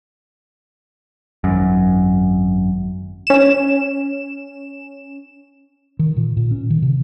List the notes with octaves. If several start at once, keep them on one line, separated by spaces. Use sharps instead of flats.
G#1 F#2
C#4 E7
D#3
A#2
A#2
C#4
D#3
C3